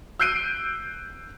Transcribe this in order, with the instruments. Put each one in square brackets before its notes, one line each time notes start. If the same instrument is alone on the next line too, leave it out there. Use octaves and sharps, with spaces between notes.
[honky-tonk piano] E6 F#6 G6 C7 D7 D#7